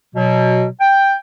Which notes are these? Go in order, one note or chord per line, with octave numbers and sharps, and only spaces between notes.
B2 F#3
G5